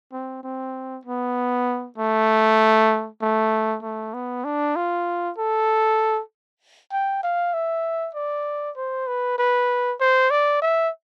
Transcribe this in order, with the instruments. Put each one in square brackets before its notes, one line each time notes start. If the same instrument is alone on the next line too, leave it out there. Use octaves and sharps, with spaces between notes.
[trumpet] C4
C4
B3
A3
A3
A3
B3
D4
F4
A4
G5
F5
E5
D5
C5
B4
B4
C5
D5
E5